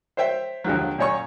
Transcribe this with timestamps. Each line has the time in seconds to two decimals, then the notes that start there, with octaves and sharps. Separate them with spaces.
0.17 C5 C#5 E5 G5
0.64 D#2 D3 F3 F#3
0.98 F#2 A#2 C#5 G#5 C#6